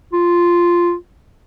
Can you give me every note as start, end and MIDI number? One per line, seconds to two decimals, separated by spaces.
0.13 0.94 65